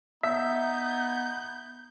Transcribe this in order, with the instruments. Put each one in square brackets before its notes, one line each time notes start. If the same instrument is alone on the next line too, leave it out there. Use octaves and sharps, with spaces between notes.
[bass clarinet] B3 [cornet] D#4 [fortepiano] E5 [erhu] G6